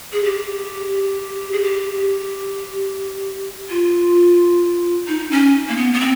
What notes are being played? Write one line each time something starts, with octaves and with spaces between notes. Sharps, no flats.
G#4
G4
G#4
G4
F4
D#4
C#4
A#3
B3
B3
C4